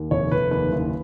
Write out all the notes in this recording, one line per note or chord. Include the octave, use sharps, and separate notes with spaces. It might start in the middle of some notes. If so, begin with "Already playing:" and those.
Already playing: D#2
F1 C#5
F1 B4
D#2 B4
F#1